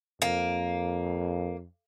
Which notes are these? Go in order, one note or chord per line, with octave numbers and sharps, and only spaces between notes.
F2 A#3